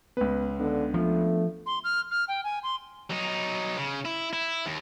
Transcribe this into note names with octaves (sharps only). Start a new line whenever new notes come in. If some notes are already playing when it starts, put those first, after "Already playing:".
C#2 B3 B4
D3 B3 D4
F3 A3
C6
F6
F6
G5
G#5
C6
F#3 D#4
C#3
E4
E4
D#2